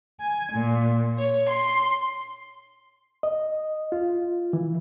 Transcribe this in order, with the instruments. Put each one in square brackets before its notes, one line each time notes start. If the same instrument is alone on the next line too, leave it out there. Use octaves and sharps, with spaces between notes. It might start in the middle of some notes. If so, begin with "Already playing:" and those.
[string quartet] G#5
A#2
C#5
C6
[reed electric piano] D#5
F4
E3